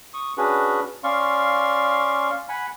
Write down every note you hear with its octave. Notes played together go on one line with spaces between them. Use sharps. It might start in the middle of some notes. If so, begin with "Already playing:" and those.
C#6 D#6
C#4 D4 F#4 G#4 B4
C#4 D5 F5 C6 C#6
F#5 G#5 B5